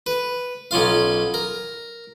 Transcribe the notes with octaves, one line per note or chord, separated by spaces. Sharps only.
B4
B1 C#4 F4 F5
A#4